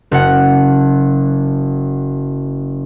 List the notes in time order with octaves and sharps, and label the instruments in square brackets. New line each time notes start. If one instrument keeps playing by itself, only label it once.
[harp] F#1 F#5